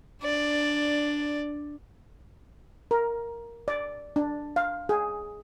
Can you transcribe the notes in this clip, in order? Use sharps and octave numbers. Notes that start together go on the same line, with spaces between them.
D4 D5
A#4
D5
D4
F5
G#4